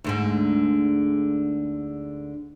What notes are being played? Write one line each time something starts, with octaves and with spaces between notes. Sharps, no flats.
D2 G#2 D3